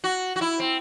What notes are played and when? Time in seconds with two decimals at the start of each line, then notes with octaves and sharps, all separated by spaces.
0.04 F#4
0.36 F#4
0.41 E4
0.60 C4